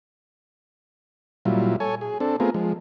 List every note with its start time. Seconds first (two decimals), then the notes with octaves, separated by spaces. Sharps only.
1.45 A#2 F#3 G3 E4 F4
1.80 A4 C#5 G#5
2.01 G#4
2.20 C4 D4 A4
2.40 A3 B3 C4 F4 G#4 A#4
2.54 F3 G#3